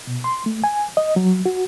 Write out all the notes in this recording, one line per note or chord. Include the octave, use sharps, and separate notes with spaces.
B2
C6
A3
G#5
D#5
F#3
F#4